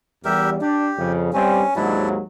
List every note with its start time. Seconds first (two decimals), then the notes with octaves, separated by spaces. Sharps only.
0.25 E2 G3 G4 A#4 E5
0.61 D4 G4
0.98 F2 C#3
1.33 G2 C4 C#4
1.76 D#2 G#2 F#3 D4 E4